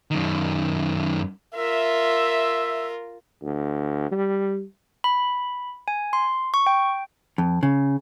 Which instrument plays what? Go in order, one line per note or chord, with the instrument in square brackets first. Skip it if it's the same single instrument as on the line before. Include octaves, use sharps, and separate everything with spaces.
[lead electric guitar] F#2 D#3
[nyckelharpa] F4 A#4 [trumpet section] E5
[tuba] D2
G3
[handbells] B5
G#5
C6
C#6
G5
[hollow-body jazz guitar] F2
C#3